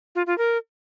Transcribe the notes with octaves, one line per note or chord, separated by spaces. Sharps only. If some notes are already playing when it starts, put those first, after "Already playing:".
F4
F4
A#4